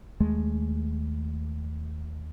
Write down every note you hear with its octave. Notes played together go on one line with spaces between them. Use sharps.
D#2 G#3 A3